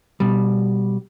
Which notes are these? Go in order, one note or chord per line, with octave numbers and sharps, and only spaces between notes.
B2 G3